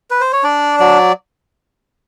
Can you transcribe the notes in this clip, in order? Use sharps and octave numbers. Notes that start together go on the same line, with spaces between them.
B4
C5
C#5
D4 D5
F#3 D5